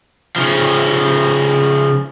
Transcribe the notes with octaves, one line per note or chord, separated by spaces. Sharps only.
C#3 F3